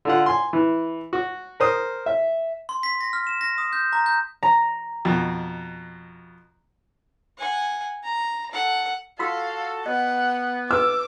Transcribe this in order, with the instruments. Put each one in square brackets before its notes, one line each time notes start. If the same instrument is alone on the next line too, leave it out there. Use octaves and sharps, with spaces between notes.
[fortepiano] D3 F4 F#5
G#5 C6
E3
F#4
A#4 C5 D#6
E5
[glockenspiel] C6
B6
A#6
F6
E7
A#6
D#6
G6
A#5
G6
[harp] A#5
[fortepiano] F2 B2
[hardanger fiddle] F#5 G#5
A#5
A4 F#5
[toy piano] F4 C6 E6 [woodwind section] F#4 A4 [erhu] F5
[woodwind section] B3 [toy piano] D#5 [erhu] F#5
[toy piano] B4 [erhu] D6 [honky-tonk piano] E6